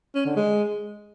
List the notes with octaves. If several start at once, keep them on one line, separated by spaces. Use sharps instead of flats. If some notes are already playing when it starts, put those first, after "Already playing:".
C#4
D3
G#3